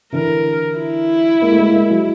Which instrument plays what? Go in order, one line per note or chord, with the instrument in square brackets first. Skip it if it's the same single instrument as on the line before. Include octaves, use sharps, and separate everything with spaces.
[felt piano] D3 E3 [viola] A#4
[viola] E4
[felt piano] G#3 A#3
A3
G#3 A#3
G#3 A#3
F#3 G#3